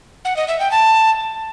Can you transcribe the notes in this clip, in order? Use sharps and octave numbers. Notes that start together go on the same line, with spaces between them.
F#5
D#5
E5
G5
A5